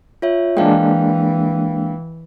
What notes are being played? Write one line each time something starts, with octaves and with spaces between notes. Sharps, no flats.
F4 C#5 E5
E3 G#3 A#3 D4 F5 G5